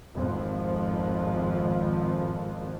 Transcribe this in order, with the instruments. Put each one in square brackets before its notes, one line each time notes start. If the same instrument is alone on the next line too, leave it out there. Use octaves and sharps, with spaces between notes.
[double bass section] G#1 F2 F3